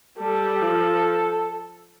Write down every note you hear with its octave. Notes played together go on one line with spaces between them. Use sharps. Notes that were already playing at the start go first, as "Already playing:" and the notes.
G3 A4
F3